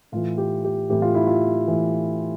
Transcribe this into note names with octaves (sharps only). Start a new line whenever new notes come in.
A2 E3 F4
G4
G4
A2 E3 G4
F4
E4
F4
A2 E3